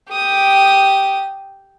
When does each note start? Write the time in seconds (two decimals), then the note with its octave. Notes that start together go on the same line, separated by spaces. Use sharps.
0.10 G4 D#6